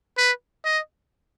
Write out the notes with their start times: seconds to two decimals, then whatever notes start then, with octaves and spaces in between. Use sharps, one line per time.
0.18 B4
0.65 D#5